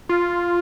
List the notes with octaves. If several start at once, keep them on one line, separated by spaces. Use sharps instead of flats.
F4